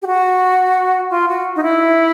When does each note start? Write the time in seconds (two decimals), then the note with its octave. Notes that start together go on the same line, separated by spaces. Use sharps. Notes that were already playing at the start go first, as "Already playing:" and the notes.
0.02 G4
0.07 F#4
1.10 F4
1.28 F#4
1.56 D#4
1.63 E4